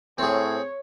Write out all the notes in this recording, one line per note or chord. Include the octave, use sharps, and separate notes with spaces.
A2 C4 G#4 C#5